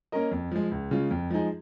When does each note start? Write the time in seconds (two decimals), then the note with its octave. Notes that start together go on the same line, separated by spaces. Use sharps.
0.12 A#3 C#4 A#4 D#5
0.31 F2
0.51 F3 G#3
0.72 C#2
0.91 C#3 G#3 F4
1.11 F2
1.30 F3 G#3 D#4 G#4